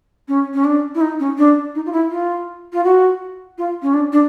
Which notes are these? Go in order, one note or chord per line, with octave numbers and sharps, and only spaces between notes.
C#4
C#4
D4
E4
D#4
C#4
D4
D#4
F4
E4
F4
F4
F#4
F4
C#4
D4
D4